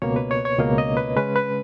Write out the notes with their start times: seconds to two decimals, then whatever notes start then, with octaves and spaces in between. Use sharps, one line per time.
0.02 C#2 B2 A#3 C#5
0.16 B4
0.31 C#5
0.45 C#5
0.59 C#2 B2 A#3 D#5
0.78 D#5
0.97 B4
1.16 C#3 G#3 C#4 B4
1.36 B4